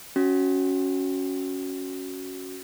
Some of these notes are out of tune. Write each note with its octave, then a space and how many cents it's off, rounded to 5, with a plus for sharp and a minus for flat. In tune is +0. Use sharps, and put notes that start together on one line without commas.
C#4 +0 F#4 +0